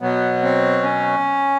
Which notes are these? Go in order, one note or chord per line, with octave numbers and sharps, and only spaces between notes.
B2 F#3 B3
C4
C#4